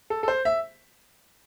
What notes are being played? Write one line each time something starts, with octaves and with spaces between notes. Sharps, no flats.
A4
A4
C5
E5